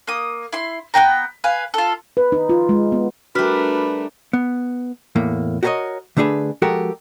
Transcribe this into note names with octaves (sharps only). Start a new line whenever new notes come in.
A#3 D#6
E4 C6
B3 C4 G5 A#5
B4 F5 G#5
F4 A4
B4
D#4
F4
G#3
B3
G3 A3 D4 F#4 A#4 B4 F6 B6
B3
E2 A2 A#3
F#4 G4 A#4 C5 C#5 D#5
D3 A3 D4 G#4 B4
F3 G#3 F#4 G4 A4 A#4